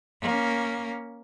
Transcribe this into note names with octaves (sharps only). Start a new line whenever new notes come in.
A#3 C#4